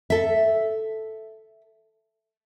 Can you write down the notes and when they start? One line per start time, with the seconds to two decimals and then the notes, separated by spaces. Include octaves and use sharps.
0.10 A4 E5